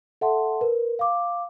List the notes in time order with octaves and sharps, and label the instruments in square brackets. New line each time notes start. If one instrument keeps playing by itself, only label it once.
[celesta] A4 E5 F#5 A5 C6
A#4 B4
F5 D6